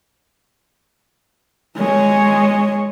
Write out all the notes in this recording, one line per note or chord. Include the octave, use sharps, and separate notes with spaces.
G#3 C#5